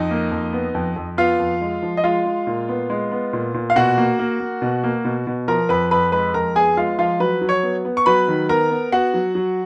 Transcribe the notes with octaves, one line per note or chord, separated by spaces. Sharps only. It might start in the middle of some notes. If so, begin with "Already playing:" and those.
Already playing: F2 D#4 D#5
A#3
F2
B3
F2
F2
B3 F4 F5
F2
G#3
F3
D#5
G#3 F4 F5
G#3
A#2
B3
G#3
B3
A#2
A#2
F5
B2 F#4 F#5
A#3
A#3
A#3
B2
A#3
B2
B2
F3 A#4 A#5
F2 B4 B5
F2 B4 B5
G#3 B4 B5
F2 A#4 A#5
B3 G#4 G#5
G#3 F4 F5
F3 F4 F5
F#3 B4 B5
F#3
C#5 C#6
B3
B3
C#6
F#3 B4 B5
D#3
B3 A#4 A#5
B3
B3 F#4 F#5
F#3
F#3